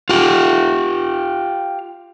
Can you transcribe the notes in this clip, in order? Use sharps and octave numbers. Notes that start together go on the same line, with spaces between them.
F4 G4